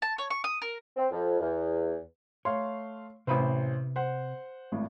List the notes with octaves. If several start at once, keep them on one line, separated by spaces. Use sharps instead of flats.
A5
C#5
C#6
D#6
A#4
C4
F2
E2
A3 C#5 F5 C6
A1 C3 B4 C5 B5
C5 F#5
G#1 A2